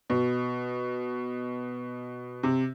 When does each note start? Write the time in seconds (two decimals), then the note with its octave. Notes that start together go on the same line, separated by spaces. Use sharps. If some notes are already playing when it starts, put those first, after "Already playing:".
0.10 B2
2.43 C3